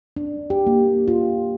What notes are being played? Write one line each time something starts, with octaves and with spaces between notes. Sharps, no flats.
D4
G4
A#3
F4